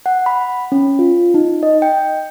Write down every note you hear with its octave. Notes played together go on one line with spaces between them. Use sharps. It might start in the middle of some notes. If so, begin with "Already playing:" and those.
F#5
B5
C#4
F4
D#4
D#5
G5